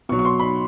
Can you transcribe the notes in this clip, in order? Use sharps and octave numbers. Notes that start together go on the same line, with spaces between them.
B2 F#3 C#6
C#6
C6
B5